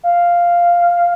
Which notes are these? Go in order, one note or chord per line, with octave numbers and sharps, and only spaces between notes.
F5